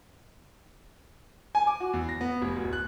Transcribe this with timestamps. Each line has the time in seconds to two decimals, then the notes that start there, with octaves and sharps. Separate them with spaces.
1.55 G#5
1.67 D6
1.80 F#4
1.93 E2
2.09 A#6
2.21 B3
2.42 F1
2.56 D1
2.73 F#6